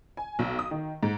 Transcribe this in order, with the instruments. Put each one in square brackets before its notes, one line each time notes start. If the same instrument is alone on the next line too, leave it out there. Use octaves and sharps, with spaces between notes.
[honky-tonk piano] G#5
B1
D#6
D#3
G#2